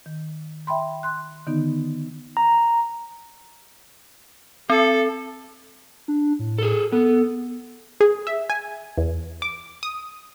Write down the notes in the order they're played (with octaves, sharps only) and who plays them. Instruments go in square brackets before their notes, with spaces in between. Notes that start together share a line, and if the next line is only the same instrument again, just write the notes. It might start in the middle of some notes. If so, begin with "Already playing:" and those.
[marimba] D#3
E5 G5 B5 C6
C6 F#6
D3 D#3 B3 D#4
[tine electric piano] A#5
[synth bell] C4 [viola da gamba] A4
[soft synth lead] D4
A2
[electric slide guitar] G#4 A4
[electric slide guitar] B3 [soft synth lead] A4
[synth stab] G#4
E5
G#5
E2
D6
D#6